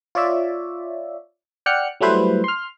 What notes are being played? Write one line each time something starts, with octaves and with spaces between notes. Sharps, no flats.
F4 C#5 D5 E5
D5 F#5 G5 F6 F#6 C#7
F#3 G3 A3 E4 B4 C5
C6 F6